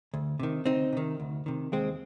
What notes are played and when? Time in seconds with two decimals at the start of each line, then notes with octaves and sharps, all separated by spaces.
0.14 D2
0.40 C3 D#3
0.66 D2 C4 D#4
0.93 C3 D#3
1.20 D2
1.46 C3 D#3
1.72 D#2 G#3 C4